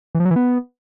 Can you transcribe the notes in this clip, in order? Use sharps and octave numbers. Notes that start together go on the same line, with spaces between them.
E3
F3
F#3
E3
B3